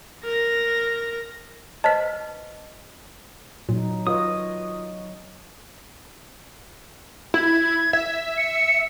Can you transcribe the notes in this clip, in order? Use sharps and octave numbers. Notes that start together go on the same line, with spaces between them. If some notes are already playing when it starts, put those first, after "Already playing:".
A#4 A#6
B4 C5 D#5 A5 B6
A#2 F#3 D#4
F4 B4 C#5 D#5 D#6
E4 G#6
E5
C#7